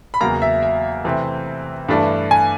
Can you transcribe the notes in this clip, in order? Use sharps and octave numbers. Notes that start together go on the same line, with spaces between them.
B5
E2 C#3 F#3 A#3 A#5
E5
E5
C3 E3 A3 C4
G2 E3 A3 D4
G#5